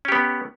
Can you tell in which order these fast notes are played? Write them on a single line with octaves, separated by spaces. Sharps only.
C#4 G4 B3